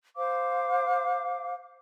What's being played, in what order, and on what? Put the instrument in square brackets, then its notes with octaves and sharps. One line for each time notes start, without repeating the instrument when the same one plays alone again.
[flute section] C5 F5 D6